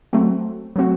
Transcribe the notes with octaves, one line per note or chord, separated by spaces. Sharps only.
F#3 A3 C4 F#4
F#3 A3 C4 F#4